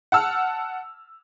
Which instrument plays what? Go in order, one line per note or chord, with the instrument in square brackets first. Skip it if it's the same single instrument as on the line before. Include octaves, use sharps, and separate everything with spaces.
[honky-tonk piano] F#5 A5 E6 F6